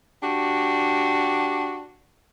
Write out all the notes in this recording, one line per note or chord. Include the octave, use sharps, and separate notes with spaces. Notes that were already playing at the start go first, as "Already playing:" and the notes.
D4 F#4 G4